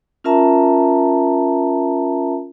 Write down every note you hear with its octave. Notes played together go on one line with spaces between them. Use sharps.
C#4 F4 A#4 E5 A5 A#5